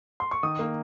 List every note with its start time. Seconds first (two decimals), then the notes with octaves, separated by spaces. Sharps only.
0.20 C6
0.31 C#6
0.43 D#3 D#6
0.59 A#3